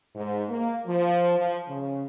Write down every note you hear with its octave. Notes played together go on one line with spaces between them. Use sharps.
G#2
A#3
F3
F3
C#3